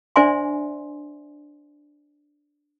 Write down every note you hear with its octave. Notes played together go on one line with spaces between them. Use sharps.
D4 C5 D5 E5 G#5 C6